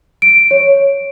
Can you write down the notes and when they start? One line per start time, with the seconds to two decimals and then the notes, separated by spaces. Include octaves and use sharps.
0.22 D7
0.51 C#5